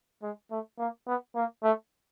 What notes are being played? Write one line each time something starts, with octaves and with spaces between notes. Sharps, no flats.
G#3
A3
A#3
B3
A#3
A3